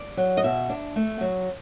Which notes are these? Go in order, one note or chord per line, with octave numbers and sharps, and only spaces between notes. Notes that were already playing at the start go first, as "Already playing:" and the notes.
Already playing: D5
F#3
D#5
B2 E5
D4
A3
F#3